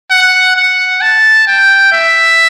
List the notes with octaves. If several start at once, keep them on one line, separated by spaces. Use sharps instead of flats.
F#5
F#5
A5
G5
E5